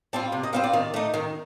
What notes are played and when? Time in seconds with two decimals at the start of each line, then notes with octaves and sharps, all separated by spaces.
0.13 G3 C4 F4 A5
0.32 C3
0.43 D#5
0.53 G3 C4 F4 F5
0.64 D5
0.73 D#3
0.94 A3 D#4
1.14 D#3